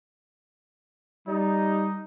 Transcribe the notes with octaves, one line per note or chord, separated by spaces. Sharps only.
G3 D#4